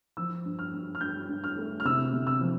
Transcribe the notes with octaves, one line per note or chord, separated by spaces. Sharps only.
F3 E6
G2
F6
G2
F6
G2 G6
G2
F6
A3
F6
C3 E6
C3
E6
F3